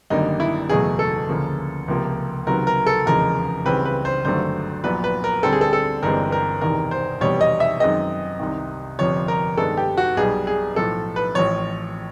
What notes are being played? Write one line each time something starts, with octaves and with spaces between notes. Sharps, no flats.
G#1 F#2 D3 G3 A#3 D#4
E4
F#1 E2 B2 F#3 A3 G#4
A4
D2 C#3 F3 A#3
C#2 C3 F3 A#3
C#2 C3 D#3 F#3 B3 A#4
A#4
A4
F1 E2 C#3 F3 G#3 A#4
C#2 C#3 E3 G3 C4 B4
B4
C5
G#1 G2 D3 F#3 A3 C5
A#1 A#2 F#3 B3 B4
B4
A#4
D2 D3 G3 C4 A4
G#4
A4
A4
G1 G2 E3 G#3 C4 A#4
A#4
E1 E2 C3 D#3 A#4
C5
F1 E2 B2 G3 C4 C#5
D#5
E5
F#2 D#3 G#3 C4 D#5
C2 C3 D#3
G1 F2 C3 F3 C#5
A#4
G2 D#3 G#3 B3 A4
G4
F#4
B1 B2 G3 G#4
G#4
B1 A2 F3 A4
B4
A1 A2 F3 C#5